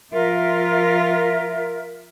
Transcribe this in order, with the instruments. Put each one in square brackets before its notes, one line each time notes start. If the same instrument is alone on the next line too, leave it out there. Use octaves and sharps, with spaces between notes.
[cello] F3 F4 [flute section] A#4 E5